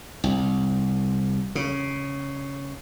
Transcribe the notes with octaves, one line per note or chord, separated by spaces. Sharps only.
C2
C#3